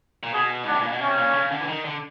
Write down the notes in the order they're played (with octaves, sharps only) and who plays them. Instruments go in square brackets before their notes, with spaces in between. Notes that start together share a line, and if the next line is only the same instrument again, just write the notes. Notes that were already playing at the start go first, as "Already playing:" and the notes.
[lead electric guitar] A#2
[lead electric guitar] B2 [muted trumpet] G#4
[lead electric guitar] G#2
[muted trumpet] D4
[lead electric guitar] A2
A#2
B2
[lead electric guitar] C3 [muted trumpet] C#4
[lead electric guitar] A#2
D3
C#3
D3
E3
D#3
D3